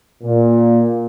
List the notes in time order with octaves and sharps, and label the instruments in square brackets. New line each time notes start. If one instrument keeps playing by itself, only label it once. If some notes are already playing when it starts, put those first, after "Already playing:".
[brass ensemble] A#2